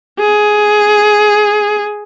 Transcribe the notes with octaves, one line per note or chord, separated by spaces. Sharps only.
G#4